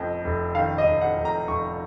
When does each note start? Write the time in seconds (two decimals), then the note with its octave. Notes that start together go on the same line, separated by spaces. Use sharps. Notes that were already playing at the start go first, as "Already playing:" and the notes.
Already playing: F1 F2 D#5
0.24 F1
0.55 D#3 F5
0.78 D#5
0.86 F1
1.01 F#5
1.17 F1
1.25 A#5
1.48 F1 C#6